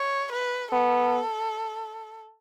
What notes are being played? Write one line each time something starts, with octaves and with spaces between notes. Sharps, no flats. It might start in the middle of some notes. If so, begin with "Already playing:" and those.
Already playing: C#5
B4
B3 A4